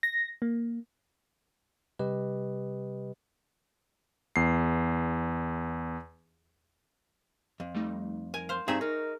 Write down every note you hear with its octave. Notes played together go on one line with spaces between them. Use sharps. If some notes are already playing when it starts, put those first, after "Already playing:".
A#6
A#3
C3 G3 G4 B4 D#5
E2 C7
F2
G3 A3 D#4
A#4 G#5
C5 F5
G2 C4 D#4 G#4 E5 C#6 G6 A#6
D#4 A#4